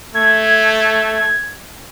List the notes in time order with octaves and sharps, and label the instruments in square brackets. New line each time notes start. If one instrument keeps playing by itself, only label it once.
[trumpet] A3 [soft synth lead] G#6